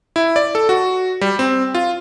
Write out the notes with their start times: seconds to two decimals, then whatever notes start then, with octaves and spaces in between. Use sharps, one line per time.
0.16 E4
0.36 D5
0.55 A4
0.69 F#4
1.21 G3
1.39 C4
1.75 F4